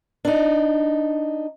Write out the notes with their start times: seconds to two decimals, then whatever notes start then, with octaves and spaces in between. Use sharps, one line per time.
0.25 D4 D#4